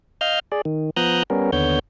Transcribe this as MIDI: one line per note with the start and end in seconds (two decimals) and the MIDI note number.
0.21 0.39 75
0.21 0.39 77
0.21 0.39 89
0.21 0.39 91
0.52 0.61 68
0.52 0.61 74
0.65 0.90 51
0.97 1.23 53
0.97 1.23 59
0.97 1.23 82
0.97 1.23 87
0.97 1.23 90
0.97 1.23 91
1.30 1.51 55
1.30 1.51 59
1.30 1.51 61
1.30 1.51 70
1.53 1.79 39
1.53 1.79 50
1.53 1.79 59
1.53 1.79 73
1.53 1.79 91